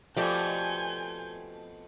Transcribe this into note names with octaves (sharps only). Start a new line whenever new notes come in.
B2 F3 A3 C4 G4 D5 G#5 G6